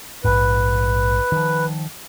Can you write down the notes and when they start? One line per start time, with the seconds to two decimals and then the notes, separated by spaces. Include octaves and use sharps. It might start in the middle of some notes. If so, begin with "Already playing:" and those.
0.24 A#1 G#2 B4
1.32 D#3 F3